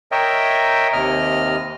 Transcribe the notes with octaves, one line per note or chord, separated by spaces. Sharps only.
A#4 C#5 D#5 E5 G5
D#2 C3 D#5 F6